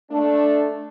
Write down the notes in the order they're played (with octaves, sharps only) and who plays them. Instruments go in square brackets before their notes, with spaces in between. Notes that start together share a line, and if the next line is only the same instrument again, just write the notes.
[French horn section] A3 D4